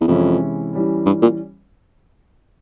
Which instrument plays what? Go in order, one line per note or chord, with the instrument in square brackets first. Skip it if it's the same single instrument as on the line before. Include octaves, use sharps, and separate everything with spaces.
[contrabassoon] E2
[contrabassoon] F2 [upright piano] C3 E3 G#3 C#4 E4
[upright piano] E3 G3 C#4
[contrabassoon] G2
A#2